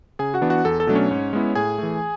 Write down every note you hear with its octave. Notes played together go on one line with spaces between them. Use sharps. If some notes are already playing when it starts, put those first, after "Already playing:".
C#3 G#4 G#5
F#4 F#5
E3 B3 D4
F#4 F#5
E2 A4
A4
B2 F#3 A3 D4
C#4 C#5
G#2
G#3 B3 E4
A2 G#4 G#5
E3 A3